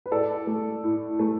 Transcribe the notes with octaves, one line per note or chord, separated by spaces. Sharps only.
B4
A2 A4 D5
A3
A2
A3